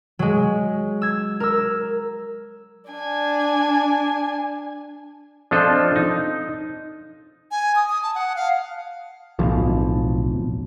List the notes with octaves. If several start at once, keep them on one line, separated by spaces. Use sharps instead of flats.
F#3 G#3
E6 G#6
A#4 E6
D4 G#5
F3 C4 D4 F4 A4 D#5
D#4
G#5
D#6
D#6
A5
F#5
F5
D1 B1 F3